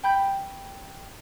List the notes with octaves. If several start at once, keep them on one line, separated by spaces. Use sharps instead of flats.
G5 B5 G6